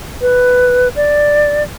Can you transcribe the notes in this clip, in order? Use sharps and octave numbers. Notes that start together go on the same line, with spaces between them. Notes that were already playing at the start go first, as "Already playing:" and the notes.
B4
D5